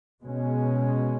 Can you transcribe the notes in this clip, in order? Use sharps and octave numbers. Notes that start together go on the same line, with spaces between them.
B2 G#3 C#4